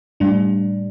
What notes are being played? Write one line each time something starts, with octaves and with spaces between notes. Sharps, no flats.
A2 G3 D4